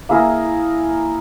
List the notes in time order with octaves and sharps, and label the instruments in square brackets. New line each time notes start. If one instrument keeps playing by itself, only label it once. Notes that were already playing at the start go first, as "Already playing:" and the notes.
[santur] A#3 E4 G#4 A#4